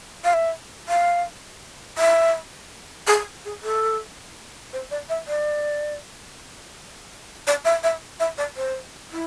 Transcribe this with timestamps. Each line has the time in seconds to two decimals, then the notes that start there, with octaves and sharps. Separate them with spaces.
0.24 F5
0.33 E5
0.89 F5
1.98 E5
3.07 G#4
3.45 G#4
3.63 A4
4.73 C5
4.91 D5
5.09 E5
5.28 D5
7.47 D5
7.65 E5
7.83 E5
8.20 E5
8.38 D5
8.57 C5
9.12 E4